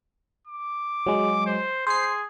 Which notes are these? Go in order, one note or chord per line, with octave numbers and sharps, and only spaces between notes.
D6
F#3 G#3
C5
G#4 C5 C7